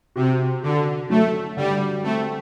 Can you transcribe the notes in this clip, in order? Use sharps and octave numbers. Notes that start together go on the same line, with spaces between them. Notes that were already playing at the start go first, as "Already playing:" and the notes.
C3 F#4
D3 F#4
F#3 A3
D3 G3
A3 C4